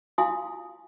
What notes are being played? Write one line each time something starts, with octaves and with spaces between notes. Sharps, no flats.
E4 F4 F5 G#5 C6 D#6